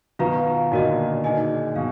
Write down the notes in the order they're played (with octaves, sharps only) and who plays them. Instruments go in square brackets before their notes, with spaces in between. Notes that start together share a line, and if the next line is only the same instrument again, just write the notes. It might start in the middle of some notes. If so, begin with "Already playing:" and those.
[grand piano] B2 D#3 [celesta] F4 B4 F5 A#5
[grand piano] A#2 D3 [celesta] D#4 F#4 A#4 D#5
[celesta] D#4 G#4 D#5 G#5
[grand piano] B2 [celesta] F5